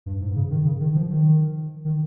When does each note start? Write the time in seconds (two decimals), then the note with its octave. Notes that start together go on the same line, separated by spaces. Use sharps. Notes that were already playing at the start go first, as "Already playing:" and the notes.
0.06 G2
0.21 G#2
0.36 C#3
0.50 D#3
0.65 C#3
0.80 D#3
0.95 F3
1.11 D#3
1.85 D#3